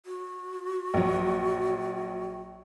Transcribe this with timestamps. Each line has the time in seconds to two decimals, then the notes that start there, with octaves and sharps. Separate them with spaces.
0.06 F#4
0.94 A#1 F#3